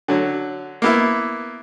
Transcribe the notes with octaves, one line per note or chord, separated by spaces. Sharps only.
D3 F#3
A#3 B3 E4